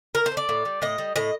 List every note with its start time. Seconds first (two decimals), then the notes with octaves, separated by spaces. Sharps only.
0.15 A#2 A#4
0.26 C5
0.31 A3
0.37 D5
0.49 A2
0.65 G3
0.82 A2 D#5
0.98 G3
1.16 A2 D#5